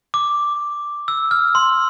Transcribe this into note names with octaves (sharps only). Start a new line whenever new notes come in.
D6
E6
F6
C6